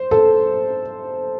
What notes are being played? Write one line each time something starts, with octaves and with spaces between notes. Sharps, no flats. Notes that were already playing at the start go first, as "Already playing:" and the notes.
Already playing: C5
A4